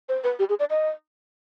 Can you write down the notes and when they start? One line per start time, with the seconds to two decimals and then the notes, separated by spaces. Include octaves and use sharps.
0.09 C5
0.24 B4
0.39 G4
0.49 G#4
0.60 D5
0.70 D#5